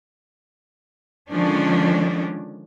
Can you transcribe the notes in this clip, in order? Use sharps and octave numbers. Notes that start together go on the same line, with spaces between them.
D3 D#3 F3 G#3 C#4 D4